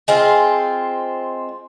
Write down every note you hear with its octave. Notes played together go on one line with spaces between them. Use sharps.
G#3 C4 F4